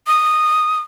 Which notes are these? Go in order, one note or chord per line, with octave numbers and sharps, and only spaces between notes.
D#6